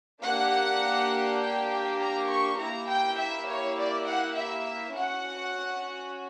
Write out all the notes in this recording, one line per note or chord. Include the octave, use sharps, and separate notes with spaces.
A#3 D4 G4 F#5
G5
G5
A#5
C#6
A#3 E4 G4 A#5
G5
E5
C#5
D5
F#5
E5
C#4 F#4 F#5